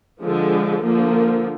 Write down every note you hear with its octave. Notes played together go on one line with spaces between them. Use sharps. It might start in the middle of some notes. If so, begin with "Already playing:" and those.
D3 F3 G#3
D3 F3 A#3